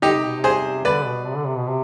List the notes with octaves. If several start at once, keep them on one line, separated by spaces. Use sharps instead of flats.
D3 D#4 G4
C3
B2
C3
G#4 C5
D3 B4 D5
B2
C3
D3
C3
B2
C3